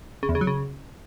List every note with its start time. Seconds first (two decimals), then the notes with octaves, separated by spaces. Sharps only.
0.23 C#3
0.29 E2
0.35 C#3
0.41 F#3
0.47 C#3